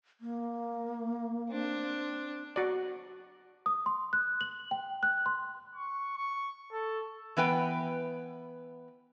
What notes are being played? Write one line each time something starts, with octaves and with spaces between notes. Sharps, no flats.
A#3
C4 D4
F#4 D5
D#6
C6
F#6
F#7
G5
F#6
C6
C#6
C#6
A4
E3 B3 B4 G5